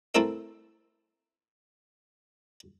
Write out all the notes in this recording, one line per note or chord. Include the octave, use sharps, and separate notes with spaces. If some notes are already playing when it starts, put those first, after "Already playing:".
A3 C4 E4 A4 A#4 E5